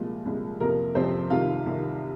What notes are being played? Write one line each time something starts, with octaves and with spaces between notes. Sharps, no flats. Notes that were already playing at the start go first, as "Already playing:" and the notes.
Already playing: C2 A#2 F3 G#3 F4
C2 A#2 F3 G#3
F2 C3 F3 A#3 A#4
F2 C3 F3 C4 C5
C2 C3 D#3 F4 F5
C2 C3 D#3